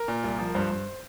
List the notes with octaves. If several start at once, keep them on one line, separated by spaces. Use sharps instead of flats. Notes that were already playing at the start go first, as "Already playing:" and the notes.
Already playing: A#4
A#2
C2
F3
G2 C5
G2